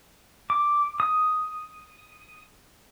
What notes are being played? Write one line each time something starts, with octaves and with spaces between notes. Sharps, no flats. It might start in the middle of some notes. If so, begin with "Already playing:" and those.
D6
D#6